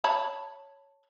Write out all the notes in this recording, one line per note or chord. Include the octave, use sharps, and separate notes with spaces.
C#5 A5 B5